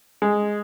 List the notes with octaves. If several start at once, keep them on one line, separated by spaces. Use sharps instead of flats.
G#3